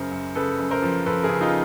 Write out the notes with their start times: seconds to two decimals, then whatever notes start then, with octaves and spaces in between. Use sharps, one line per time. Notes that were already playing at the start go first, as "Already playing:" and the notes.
Already playing: F#2 C#3 A#4 C5
0.12 F#2
0.35 C#3 A4 B4
0.59 F#2
0.71 A#4 C5
0.82 F3
1.06 F3 A4 B4
1.23 G#4 A#4
1.29 C#3
1.41 D#4 F4